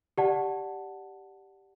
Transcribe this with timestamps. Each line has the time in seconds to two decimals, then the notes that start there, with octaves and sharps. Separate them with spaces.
0.18 G4 D5 F#5 A5